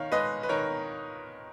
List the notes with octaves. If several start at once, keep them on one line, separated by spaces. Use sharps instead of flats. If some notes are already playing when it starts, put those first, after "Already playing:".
Already playing: D#3 C#5 F5
G#3 B4 D#5
B4
D#3 A#4 C#5